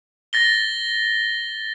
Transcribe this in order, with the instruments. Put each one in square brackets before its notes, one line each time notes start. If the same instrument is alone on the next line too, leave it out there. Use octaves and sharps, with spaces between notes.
[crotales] A6 A#6 G7